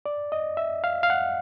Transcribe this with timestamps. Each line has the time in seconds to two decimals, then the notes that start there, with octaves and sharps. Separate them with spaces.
0.06 D5
0.32 D#5
0.57 E5
0.84 F5
1.03 F5
1.10 F#5